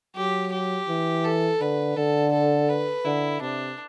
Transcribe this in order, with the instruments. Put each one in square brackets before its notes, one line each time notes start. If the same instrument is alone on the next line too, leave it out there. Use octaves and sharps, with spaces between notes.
[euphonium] F#3 [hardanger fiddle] G4
[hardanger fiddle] G4
[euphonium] E3
[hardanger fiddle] A4
[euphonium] D3 [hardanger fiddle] B4
[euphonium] D3 [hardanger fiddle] A4
[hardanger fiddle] A4
B4
[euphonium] D3 [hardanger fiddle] E4
[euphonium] C3 [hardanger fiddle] D4